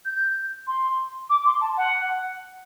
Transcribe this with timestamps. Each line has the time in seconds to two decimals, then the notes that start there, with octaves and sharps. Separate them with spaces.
0.05 G6
0.67 C6
1.30 D6
1.46 C6
1.61 A5
1.77 F#5